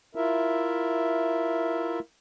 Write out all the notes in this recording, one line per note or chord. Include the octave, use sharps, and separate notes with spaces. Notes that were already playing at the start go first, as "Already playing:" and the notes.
E4 F4 A#4 E5